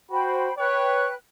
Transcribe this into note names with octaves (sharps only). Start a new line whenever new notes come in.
F#4 C5 G5 B5
B4 C#5 G5 F#6